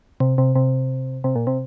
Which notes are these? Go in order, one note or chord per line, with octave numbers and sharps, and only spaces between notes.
C3
C3
C3
C3
A#2
C3